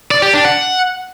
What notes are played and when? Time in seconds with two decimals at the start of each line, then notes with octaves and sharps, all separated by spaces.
0.11 D5
0.22 G4
0.34 D4
0.45 F#5